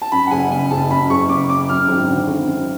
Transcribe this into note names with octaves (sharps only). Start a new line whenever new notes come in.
A5
F#2 B5
F#5
F#1 G#5
C#3 G#5
F#1 A5
F#2 B5
F#1 C#6
C#3 D6
F#1 D6
F#2 F6
G#1
D3
G#1
F#2